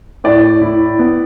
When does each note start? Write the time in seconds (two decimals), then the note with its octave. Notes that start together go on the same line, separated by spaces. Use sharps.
0.24 A2 D5
0.61 E4
0.99 B3